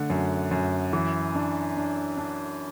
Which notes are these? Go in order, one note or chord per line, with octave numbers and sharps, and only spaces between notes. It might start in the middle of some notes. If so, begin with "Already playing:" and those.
Already playing: D3 A3
F#2
F#2
E3
D4
D4
D4